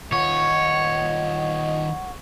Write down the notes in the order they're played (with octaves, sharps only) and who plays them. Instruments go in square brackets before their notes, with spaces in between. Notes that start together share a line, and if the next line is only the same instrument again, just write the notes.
[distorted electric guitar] D#3 F4 [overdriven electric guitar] C#5 [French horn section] D#5 [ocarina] F#5